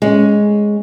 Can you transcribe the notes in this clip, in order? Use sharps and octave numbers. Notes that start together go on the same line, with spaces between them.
G#3 C#4